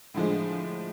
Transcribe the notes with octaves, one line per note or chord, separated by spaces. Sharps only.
A2 D3 F3 G#3